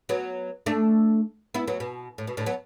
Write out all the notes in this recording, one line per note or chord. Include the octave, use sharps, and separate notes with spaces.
F#3 B3
A3 D4
B3 E4
F#3 B3
B2
A2
B2
A2 D3
F#3 B3